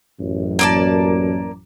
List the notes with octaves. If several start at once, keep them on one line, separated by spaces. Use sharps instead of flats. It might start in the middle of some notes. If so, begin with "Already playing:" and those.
A1 F#2
A#3 D5 A5